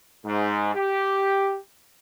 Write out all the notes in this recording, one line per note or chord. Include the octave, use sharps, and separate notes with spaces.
G#2
G4